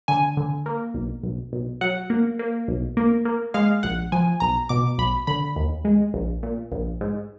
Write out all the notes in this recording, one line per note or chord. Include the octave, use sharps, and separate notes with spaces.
D3 G#5
D3
A#3
B1
B1
B1
F#3 F#5
A#3
A#3
B1
A#3
A#3
G#3 F5
A#1 F#5
F3 G#5
B1 A#5
B2 D6
B1 B5
D3 B5
D#2
G#3
A#1
A#2
A#1
G#2